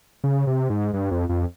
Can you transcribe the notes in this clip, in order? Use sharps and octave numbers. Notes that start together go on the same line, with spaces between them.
C#3
C3
G#2
G2
F2
F2